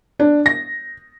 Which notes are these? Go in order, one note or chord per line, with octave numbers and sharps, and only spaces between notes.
D4
A#6